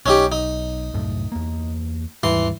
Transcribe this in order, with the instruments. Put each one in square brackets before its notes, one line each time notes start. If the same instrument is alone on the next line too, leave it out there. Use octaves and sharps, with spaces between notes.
[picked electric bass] B1 [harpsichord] C#4 D#4 G4
[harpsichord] D#4
[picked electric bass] C2 F#2 A2
E2 A#3
[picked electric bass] D#2 G#2 G3 [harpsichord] E3 C6